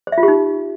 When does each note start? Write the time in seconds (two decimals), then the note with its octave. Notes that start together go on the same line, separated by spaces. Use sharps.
0.07 C5
0.12 E5
0.18 F4
0.23 G4
0.28 D#4